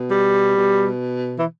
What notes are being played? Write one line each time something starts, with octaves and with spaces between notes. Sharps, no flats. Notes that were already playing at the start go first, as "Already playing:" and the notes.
Already playing: B2
G3
B2
E3